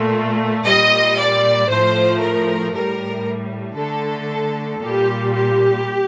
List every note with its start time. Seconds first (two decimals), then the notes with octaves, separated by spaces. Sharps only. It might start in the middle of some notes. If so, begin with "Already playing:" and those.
Already playing: A#2 A3
0.65 A#2 G3 D#5
1.17 D5
1.69 A2 F3 A3 C5
2.20 A#4
2.73 A2 G3 A#4
3.76 D3 A3 A4
4.80 A#2 G3 G4
5.33 G4